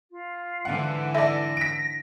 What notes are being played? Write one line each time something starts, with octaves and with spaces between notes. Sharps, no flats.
F4
G#2 D3 E3 F#5
A4 D5 E5 A#6
B6 D7